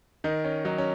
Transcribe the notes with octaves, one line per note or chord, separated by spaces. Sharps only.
D#3 D#4
C#4
F#3 D#4
C#4